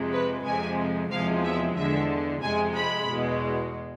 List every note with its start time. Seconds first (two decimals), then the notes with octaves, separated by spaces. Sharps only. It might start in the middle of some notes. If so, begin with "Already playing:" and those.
Already playing: F2 C3 G#3
0.12 B4
0.45 F2 C3 G#3 G#5
1.11 E2 C3 F3 G#3 F5
1.44 E5
1.76 E2 D3 G#3 E5
2.42 F2 C3 G#3 G#5
2.76 B5
3.08 E2 B2 G#3